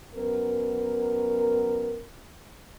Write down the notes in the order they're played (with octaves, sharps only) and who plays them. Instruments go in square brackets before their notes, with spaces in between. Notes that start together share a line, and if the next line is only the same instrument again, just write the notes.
[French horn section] F#2 B3 A#4